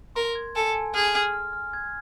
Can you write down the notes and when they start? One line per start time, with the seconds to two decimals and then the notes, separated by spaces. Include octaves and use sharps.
0.15 A#4 C6
0.35 G#6
0.56 A4 G#5
0.75 G#5
0.94 G#4 F6
1.15 F6
1.34 F6
1.53 F6
1.73 G#6